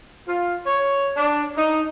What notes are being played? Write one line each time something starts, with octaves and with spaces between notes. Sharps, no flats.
F4
C#5
D4
D#4